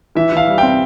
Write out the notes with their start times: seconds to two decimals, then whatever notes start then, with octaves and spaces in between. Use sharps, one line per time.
0.15 E3 E5
0.32 E3 F5
0.47 G3
0.58 C4 G5